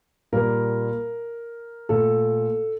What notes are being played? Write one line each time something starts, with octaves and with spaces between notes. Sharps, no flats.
A#2 G3 A#3 A#4
A#2 A3 A4